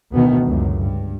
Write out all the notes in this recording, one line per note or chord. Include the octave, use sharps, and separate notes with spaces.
D2 B2 D#3 B3
C#2 F#2
G2